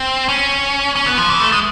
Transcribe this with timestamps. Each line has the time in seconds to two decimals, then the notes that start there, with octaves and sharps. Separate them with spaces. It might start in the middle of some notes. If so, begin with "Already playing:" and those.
Already playing: C4
0.29 C#4
0.95 C#4
1.06 B3
1.18 F3
1.30 E3
1.40 A3
1.52 G#3